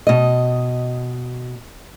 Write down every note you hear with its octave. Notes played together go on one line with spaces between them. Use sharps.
B2 D#5